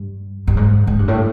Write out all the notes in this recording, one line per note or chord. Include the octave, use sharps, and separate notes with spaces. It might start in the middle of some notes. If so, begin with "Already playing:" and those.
Already playing: G2
G2
G#2
G#2
G2
A2